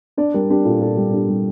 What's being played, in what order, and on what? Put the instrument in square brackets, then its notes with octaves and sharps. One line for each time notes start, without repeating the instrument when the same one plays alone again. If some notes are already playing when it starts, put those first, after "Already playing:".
[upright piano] D4 D5
G3 A#4
D4 G4
A#2 A4
A#2 A4
G3
D4 G4
G3